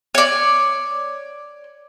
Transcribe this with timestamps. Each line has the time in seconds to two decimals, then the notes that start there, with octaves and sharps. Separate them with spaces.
0.15 C#5 D5